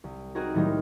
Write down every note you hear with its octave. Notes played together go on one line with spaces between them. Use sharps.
C2
C4 D#4 F#4 G#4 A#4
A2 D#3 F#3 G3 A#3 D#4